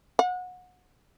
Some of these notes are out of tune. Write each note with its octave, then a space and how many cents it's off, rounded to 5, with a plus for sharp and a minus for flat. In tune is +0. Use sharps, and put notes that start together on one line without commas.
F#5 -25